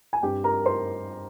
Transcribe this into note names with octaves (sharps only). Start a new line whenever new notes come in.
G#5
G2 G3 C4 G4 G5
A#4 A#5
C5 C6